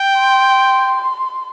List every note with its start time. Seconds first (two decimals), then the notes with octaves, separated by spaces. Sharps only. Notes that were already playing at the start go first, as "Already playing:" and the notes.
Already playing: G5
0.18 C6